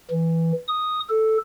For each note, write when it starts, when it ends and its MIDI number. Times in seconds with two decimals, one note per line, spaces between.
0.10 0.52 52
0.68 1.00 87
1.09 1.37 69